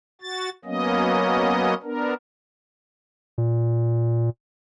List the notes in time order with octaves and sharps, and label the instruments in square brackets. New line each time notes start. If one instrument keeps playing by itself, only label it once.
[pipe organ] F#4 A6
F#3 A#3 B3 C#4 D#5
B3 D4 A#4
[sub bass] A#2